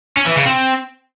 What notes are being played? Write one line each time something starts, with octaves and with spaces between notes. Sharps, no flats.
C#4
E3
C#3
C4